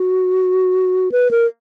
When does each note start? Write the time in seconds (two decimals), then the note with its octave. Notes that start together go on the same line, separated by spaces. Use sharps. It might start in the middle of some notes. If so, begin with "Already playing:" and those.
Already playing: F#4
1.12 B4
1.31 A#4